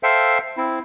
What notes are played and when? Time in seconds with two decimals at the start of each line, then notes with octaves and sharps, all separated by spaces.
0.03 A4 C5 E5 F5 G5
0.57 C4 E4